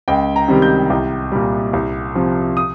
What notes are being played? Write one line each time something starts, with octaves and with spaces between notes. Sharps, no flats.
C#2 G5
A#5
C3 D#3 G3
G6
C2
A#2 G3
C2
C3 F3
D#6